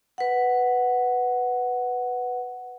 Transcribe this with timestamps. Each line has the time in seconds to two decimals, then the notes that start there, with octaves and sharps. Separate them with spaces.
0.18 B4 F#5